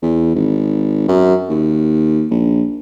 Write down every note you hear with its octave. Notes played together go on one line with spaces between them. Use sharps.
E2
G#1
F#2
D#2
A#1